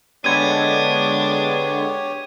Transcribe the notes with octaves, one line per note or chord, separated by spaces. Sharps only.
D3 G#3 B3 D4 G4 C#5 G#6 D#7